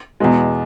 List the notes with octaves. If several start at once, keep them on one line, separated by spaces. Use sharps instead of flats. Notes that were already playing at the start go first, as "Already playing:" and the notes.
E2 B2 G#3